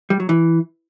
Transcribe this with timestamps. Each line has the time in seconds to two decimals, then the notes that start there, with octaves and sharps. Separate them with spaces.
0.10 G3
0.20 F#3
0.29 E3